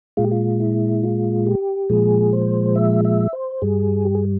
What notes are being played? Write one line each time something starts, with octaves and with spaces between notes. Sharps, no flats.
A#2 G#3 F4
G4
F4
E4
F4
G4
A#2 F3 G#3 G#4
C5
E5
E5
C5
G2 G3 G#4
G4
G#4